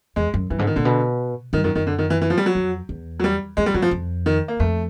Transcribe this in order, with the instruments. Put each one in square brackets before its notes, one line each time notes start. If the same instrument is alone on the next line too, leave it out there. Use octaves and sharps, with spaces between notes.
[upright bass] E2 [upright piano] G#3
[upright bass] F#2
[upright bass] G2 [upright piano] E3
[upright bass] G#2 [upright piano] D3
[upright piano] D#3
[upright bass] A#2 [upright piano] D3
[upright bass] B2
[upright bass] G2 [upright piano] D#3
[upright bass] F#2 [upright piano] D#3
[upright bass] F#2 [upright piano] D#3
[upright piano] D3
D#3
E3
E3
F3
G3
F#3
[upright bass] F2
E2
[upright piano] F#3
G3
[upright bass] F2 [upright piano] G#3
[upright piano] G3
[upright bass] F2 [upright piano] F#3
[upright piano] F3
[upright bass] F2
[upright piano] D#3
A#3
[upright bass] F2 [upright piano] A3